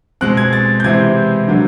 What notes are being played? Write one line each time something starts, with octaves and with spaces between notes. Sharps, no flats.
B2 G#3 C4 F#6
G#6
A6
G6
C3 E3 G#3 C4 E4 G#6
D3 F#3 A#3